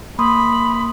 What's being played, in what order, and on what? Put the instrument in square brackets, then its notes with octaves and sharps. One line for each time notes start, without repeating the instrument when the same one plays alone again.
[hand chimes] A#3 C6 D#6 [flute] B5